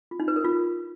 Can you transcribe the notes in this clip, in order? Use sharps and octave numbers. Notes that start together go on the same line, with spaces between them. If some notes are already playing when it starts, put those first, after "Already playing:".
F4
D#4
B4
A#4
F4